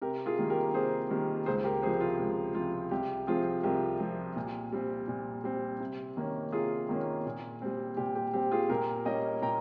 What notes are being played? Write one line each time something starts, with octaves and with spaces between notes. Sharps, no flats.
C3 G4 A#4
F4 G#4
D#3 G3 A#3
G4 A#4
C3 G#4 C5
D#3 G3 A#3
C#2 G#4 C5
G4 A#4
C3 F3 G#4 C5
F4
C#2
C3 F3 F4
C2 G4
C3 F3 C4 F4 G#4
C2 G4 A#4
C3 F3 C4
A#2
G3 C4
A#2
G3 C4
C3
D#3 A#3 C#4
C3 F4 G#4
D#3 A#3 C#4
A#2
G3 C4
A#2 G4
G4
G3 C4 G4
F4 G#4
A#2 G4 A#4
G3 A#3 C#4 D#5 G5
A#2 G5 A#5